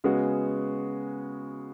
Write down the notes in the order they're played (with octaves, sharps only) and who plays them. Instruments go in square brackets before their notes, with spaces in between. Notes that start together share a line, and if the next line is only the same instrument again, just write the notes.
[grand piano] C#3 G#3 B3 F#4